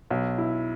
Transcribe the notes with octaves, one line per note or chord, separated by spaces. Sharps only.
B1
E4